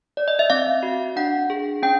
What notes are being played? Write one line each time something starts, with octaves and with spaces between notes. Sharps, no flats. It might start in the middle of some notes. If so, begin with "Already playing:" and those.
D5
D#5
E5
C4 F5
F#4
D4 F#5
G#4
C#4 G5